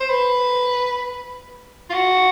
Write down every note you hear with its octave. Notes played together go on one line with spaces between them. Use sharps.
C5
B4
F4
F#4